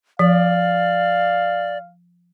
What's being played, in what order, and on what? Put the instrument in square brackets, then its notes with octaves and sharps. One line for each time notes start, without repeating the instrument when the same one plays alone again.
[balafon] F3 [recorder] D5 [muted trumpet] F5